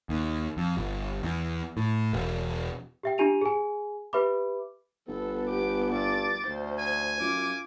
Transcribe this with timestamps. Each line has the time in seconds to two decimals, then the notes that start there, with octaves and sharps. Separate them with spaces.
0.09 D#2
0.57 F2
0.77 G1
1.23 E2
1.77 A2
2.13 E1
3.03 G4 E5 G5
3.18 D4 F4 G4 G#5 D#7 F7
3.41 G#4 G#5
4.13 G4 B4 E5 B5 D6
5.08 G1 B3 A4
5.49 G4 D6
5.91 G2 D6 A6
6.48 D2 C5
6.79 G#5
7.20 F#2 F4 D6